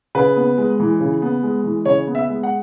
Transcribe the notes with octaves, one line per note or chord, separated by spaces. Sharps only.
C#3 B4
B3
G#3
E3
C#3
B3
G#3
E3
C#3 C#5
B3
E5
G#3
F#5